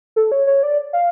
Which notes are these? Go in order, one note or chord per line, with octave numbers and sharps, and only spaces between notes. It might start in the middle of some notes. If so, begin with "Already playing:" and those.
A4
C#5
C#5
D5
F5